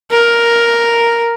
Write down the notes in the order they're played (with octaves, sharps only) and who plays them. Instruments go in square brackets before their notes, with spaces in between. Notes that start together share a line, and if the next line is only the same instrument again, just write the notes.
[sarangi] A#4